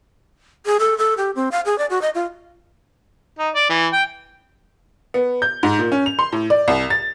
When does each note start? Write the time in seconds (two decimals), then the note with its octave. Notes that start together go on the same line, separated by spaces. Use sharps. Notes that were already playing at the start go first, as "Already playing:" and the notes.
0.66 G#4
0.80 A4
0.98 A4
1.17 G4
1.36 C4
1.52 F5
1.66 G#4
1.78 D5
1.90 F#4
2.02 D#5
2.15 F4
3.39 D#4
3.55 D5
3.70 E3
3.93 G5
5.14 B3
5.42 G6
5.63 G#2
5.79 A#2
5.92 C#4
6.06 F7
6.19 C6
6.33 A2
6.50 D5
6.68 C2
6.90 A6